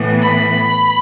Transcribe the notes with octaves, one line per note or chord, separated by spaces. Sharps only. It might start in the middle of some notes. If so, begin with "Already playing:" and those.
Already playing: A2 E3 B3
B5